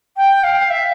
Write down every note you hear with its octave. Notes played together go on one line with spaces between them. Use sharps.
G5
F5
E5